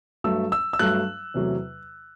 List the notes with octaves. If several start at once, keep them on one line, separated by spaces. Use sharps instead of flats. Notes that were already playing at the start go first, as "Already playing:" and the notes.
G2 F#3 A3 E6
E6
E6
G2 F#3 A3 F#6
E2 C3 F#3 A3